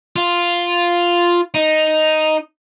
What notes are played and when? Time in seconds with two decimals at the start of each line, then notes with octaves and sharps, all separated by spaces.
0.16 F4
1.54 D#4